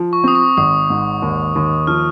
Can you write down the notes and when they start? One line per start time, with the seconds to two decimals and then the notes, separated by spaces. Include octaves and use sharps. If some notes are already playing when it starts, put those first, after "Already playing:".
Already playing: F3
0.13 C#6
0.24 C4 D#6
0.35 C#6
0.57 G#1 D#6
0.90 G#2
1.22 D#2
1.56 D#2
1.87 F3 F6